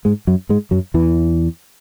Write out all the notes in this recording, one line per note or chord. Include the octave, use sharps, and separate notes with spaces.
G#2 G#3
F#2 F#3
G#2 G#3
F#2 F#3
E2 E3